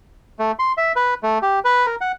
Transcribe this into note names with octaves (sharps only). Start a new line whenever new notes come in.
A3
C6
E5
B4
A3
G4
B4
A#4
F#5